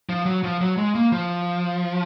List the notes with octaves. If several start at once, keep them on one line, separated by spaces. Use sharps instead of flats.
F3
F#3
F3
F#3
G#3
A#3
F3